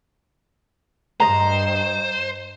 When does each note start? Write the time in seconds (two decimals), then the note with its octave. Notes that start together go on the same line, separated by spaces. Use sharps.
1.20 G2 C5 D#5 A#5